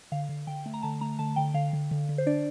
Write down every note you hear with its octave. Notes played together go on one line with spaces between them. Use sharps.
D3 F5
D3
D3 G5
A3
A#5
D3 A5
A3 A#5
D3 A5
D3 G5
D3 F5
D3
D3
D3
C5
D4 D5